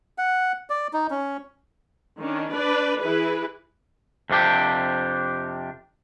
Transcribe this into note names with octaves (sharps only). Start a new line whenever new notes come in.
F#5
D5
D#4
C#4
D#3 C#4 D4
D4 B4 D5
E3 E4 G#4 B4
F2 C3 D4 G4